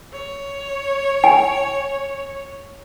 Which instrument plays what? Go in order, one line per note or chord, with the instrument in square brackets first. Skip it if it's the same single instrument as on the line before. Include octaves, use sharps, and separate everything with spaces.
[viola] C#5
[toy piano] G#5